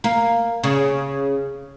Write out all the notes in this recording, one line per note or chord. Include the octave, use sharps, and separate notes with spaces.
A#3
C#3